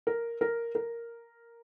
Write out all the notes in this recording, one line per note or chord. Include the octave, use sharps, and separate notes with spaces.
A#4
A#4
A#4